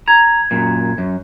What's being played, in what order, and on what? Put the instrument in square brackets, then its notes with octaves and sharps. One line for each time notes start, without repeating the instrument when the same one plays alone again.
[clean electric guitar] A#5 [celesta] G#6
[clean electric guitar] F#2 A#2
F#2